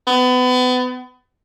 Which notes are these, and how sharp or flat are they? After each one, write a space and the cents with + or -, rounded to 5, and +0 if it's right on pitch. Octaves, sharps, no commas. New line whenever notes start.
B3 +30